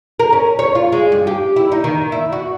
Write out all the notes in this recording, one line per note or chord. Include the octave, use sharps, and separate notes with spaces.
A#4
C#4
C#5
F4
G#3
G2
G4
E4
D#4
D#3
E4
F#4